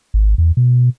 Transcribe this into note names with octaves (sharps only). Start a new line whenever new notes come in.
G#1
E2
B2